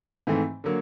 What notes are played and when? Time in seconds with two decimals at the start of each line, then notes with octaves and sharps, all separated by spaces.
0.27 G#2 E3 A3 C4
0.64 D3 F#3 A#3